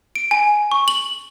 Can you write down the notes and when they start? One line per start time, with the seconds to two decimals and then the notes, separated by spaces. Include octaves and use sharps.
0.16 D7
0.31 G#5
0.72 C#6
0.88 F#7